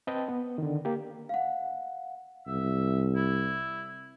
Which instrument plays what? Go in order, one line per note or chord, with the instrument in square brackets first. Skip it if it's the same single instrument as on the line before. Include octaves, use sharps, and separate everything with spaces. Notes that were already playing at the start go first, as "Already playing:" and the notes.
[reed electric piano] C4 B4 D#5 G5 A5
B3
D3 D#3
A#3 G4
[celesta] F5 F#5
[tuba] C2 [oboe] E5
[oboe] E4